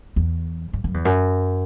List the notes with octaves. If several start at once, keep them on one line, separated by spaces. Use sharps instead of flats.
E2
G2
F#2
E2
F#2